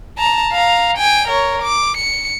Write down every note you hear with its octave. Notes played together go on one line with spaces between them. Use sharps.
A5 A#5
F5 A#5
G5 G#5
A#4 C#5
D6
C#7